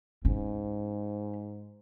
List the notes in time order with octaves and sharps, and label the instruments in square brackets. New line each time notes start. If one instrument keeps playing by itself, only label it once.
[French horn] G#2 [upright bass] C#4